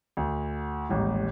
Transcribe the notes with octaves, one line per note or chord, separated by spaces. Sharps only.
D2
D#1 A1 G#2